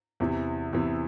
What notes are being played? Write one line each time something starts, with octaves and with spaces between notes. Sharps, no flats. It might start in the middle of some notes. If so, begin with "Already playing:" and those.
E2 C3 E3
E2 C3 E3